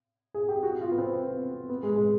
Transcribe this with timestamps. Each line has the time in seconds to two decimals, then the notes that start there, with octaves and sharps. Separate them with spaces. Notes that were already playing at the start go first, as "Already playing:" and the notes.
0.34 G#4
0.49 G4
0.63 F#4
0.81 F4
0.92 B3
0.98 C4
1.69 B3
1.83 G#3
1.96 G#3